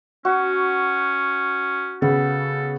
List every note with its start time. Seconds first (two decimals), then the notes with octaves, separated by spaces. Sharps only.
0.25 C#4 F#4
2.02 C#3 B3 A4